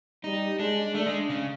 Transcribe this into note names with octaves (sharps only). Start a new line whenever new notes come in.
G3 D#4
G#3 D4
A3 D4
G#3
C#3